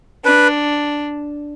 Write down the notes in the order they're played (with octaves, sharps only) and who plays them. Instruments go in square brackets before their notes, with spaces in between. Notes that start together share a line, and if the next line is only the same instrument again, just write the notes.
[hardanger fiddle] D4 [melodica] B4